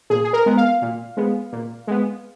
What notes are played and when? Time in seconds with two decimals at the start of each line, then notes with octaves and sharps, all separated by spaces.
0.10 A#2 G#4
0.24 G#4
0.33 A#4
0.46 G#3 B3
0.57 F5
0.82 A#2
1.17 G#3 B3
1.52 A#2
1.87 G#3 B3